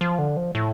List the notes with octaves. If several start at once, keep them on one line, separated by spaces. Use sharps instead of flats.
F3
D3
F3
A2